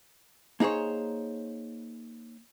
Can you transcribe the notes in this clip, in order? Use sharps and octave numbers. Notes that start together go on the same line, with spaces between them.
A#3 D#4 G#4 C5 C#5